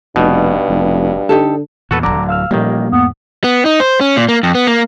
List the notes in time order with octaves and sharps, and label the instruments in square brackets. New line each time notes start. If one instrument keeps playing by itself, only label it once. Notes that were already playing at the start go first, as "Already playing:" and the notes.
[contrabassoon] F1 [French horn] G2 [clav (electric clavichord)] B2 [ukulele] D#4
[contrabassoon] F1
[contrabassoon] D3 [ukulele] D#4 G4 A4
[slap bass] E2 A#2 [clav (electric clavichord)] F#4 A4 B4
[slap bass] D1 A#1 F#3 [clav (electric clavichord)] D3 [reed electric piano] A#5 D6
[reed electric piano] F5 E6 F6
[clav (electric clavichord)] A1 D#3 [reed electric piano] A#2 F3 G3 [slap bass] A#3
[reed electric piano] E2 G#2 [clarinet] B3
[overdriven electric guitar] B3
D#4
C5
C#4
A#2
A#3
F2
B3
A#3